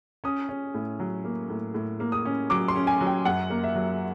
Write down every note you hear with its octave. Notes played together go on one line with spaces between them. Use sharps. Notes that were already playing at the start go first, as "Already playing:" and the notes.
C#4 D#6
C#4
A2
F#3
A#3
A2
A2
A#3
D#6
C#4
F#3 D6
C6
C#4
G#5
F#3
G5
F#2 F#5
A#3
E5
F#3